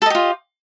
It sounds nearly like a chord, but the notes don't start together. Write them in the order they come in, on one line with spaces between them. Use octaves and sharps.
A4 D#5 G4 F4